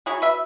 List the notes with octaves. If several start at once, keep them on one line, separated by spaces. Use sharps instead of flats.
F#3 E4 G#4 C#5
B4 E5